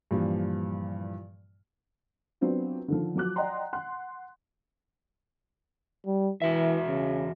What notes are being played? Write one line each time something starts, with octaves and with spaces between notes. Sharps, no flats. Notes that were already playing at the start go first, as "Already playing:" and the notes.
G2 A#2 E3 F3 G3
F#3 B3 C4 D4 F4
D3 D#3 F3
F3 F#3 D6 F#6
D5 D#5 F#5 G5 A#5 C6
F#5 C6 F#6
G3
E2 E3 F#4 E5
C#3